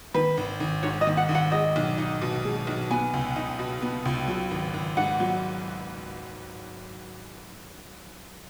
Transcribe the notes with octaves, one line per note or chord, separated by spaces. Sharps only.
D#3 B4
G#1
G#1
G#2 C#5
D#5
D#3
F#5
G#1
F#5
G#3 D#5
B1
D#4
B2
G#3
B1
B3 G#5
C#2
D#4
B2
B3
C#2
F#3
G#1
G#1
G#2 F#5
F#3